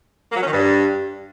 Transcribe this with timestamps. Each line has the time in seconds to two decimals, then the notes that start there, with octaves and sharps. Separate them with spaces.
0.31 A#3
0.36 F#3
0.42 C#4
0.47 D#3
0.52 G2